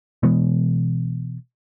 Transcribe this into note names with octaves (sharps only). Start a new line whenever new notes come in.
B2 E3 G#3 B3